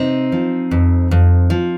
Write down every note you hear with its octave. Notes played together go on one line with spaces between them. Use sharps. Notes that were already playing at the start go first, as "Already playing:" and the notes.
Already playing: C3 C4 D#4
F3
F2
F2
F3